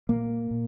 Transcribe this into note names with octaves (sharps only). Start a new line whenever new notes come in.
A#2 A#3
A#2